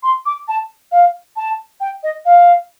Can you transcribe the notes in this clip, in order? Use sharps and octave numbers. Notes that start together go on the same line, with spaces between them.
C6
D6
A5
F5
A5
G5
D#5
F5